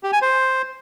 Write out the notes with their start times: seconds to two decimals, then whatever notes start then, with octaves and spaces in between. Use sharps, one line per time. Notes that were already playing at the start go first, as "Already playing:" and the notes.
0.03 G4
0.13 G#5
0.22 C5